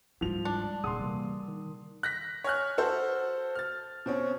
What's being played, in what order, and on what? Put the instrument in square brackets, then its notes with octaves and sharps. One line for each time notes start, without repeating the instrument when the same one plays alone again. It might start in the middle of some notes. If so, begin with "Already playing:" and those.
[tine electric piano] G#2 [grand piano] F3 F7 [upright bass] G3 G#3
[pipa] D4
[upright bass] D#1 [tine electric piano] G#4 F#5 [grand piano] C6 D#6
[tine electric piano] C3 E3 A#3 [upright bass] G3
[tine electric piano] D#3
[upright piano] F#6 A#6 B6
C#5 G#5 F6 F#6
F#4 A4 C5
F6 A6
B2 C4 C#4